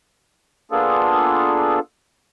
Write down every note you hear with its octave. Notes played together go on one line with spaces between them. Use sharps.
A#3 B3 D4 F4 G#4 A4